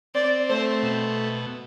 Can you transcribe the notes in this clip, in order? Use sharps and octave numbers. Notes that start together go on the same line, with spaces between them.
C4 D5
A3 C5
B2